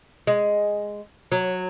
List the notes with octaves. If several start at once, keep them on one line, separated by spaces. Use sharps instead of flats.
G#3
F#3